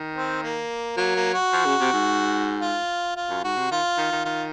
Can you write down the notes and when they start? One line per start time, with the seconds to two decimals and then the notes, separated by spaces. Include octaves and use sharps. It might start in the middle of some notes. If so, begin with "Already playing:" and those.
Already playing: D#3
0.15 C4
0.43 A#3
0.97 F#3 A#3
1.16 A#3
1.34 F#4
1.53 F3
1.66 C#3
1.80 C3
1.93 G#2
2.61 F4
3.16 F4
3.30 F#2
3.44 G#2 F#4
3.57 C3
3.71 D#3 F4
3.98 D#3
4.12 D#3
4.25 D#3 F4